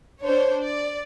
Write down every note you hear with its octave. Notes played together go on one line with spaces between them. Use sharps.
D4 C5 C#5
D5